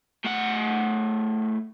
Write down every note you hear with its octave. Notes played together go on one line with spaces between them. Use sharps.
A2 F#5